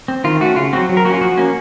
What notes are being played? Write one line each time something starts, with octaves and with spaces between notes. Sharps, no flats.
C4
D#3 F4
A3 C#4 F#4
C#3 F4
F#3 C4 F#4
F#3
A#4
A#3 F#4
C#4 F4
F3 F#4
A#3 C#4